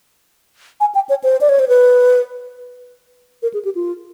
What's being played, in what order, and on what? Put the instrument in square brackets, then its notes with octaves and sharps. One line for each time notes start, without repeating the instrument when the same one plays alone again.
[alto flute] G#5
G5
C#5
C5
D5
C#5
C5
B4
A#4
G#4
G4
F4